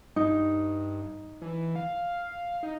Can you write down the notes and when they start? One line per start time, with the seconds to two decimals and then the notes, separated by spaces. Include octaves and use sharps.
0.16 G2 D#4
1.42 E3
1.75 F5
2.63 D#4